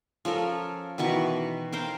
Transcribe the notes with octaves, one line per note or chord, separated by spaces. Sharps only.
F3 C#4 A4 A#4
B2 D#3 E3 C#6
A#4 C5 F5 G5